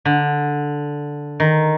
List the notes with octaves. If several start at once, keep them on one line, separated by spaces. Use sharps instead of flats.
D3
D#3